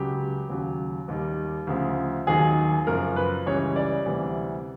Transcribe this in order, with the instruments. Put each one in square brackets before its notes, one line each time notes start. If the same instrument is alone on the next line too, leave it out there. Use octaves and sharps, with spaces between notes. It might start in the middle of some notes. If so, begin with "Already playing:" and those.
Already playing: [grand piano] C#2 C#3 F#3 G4
D#2 C#3 F#3
D#2 D#3 G3
D2 C#3 F3
D#2 D#3 F#3 G#4
F#2 C#3 F3 A#4
B4
C#2 C#3 E3 G3 C#5
D5
D2 C3 E3 G3